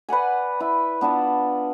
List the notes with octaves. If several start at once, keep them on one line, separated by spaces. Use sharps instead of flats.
B4 D5 F#5 G#5
E4
B3 D4 F4 A5